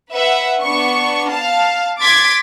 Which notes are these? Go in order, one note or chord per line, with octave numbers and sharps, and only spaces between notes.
B4 E5 F#5
B3 D4 C#6
F5 A5
C6 D6 G#6 A6 B6 D7